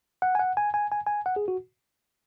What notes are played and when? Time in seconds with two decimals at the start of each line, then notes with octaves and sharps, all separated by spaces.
0.22 F#5
0.35 G#5
0.39 F#5
0.57 G#5
0.74 G#5
0.92 G#5
1.06 G#5
1.26 F#5
1.36 G#4
1.48 F#4